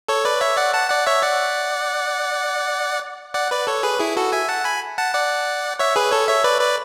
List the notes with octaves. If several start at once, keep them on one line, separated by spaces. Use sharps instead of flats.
A4 C#5
B4 D5
C#5 E5
D5 F#5
F#5 A5
D5 F#5
C#5 E5
D5 F#5
D5 F#5
B4 D5
A4 C#5
G#4 B4
E4 G#4
F#4 A4
E5 G#5
F#5 A5
G#5 B5
F#5 A5
D5 F#5
C#5 E5
G#4 B4
A4 C#5
C#5 E5
B4 D5
B4 D5